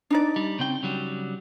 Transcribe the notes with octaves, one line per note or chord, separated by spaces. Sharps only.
D4 D#4 D5
G3
C#3 C4 G5
C#3 F#3 G3